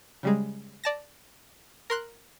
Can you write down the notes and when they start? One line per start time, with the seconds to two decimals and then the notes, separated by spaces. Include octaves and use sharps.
0.23 C#3 G3 G#3
0.84 D5 A5 A#6
1.90 A#4 C6 F#6